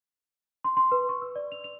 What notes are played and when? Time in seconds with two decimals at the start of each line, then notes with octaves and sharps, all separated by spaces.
0.64 C6
0.77 C6
0.92 B4
1.09 C#6
1.22 E6
1.36 D5
1.52 F7
1.64 F7